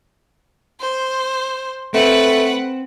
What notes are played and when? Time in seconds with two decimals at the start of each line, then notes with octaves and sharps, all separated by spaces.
0.80 C5
1.94 A3 C4 B4 F#5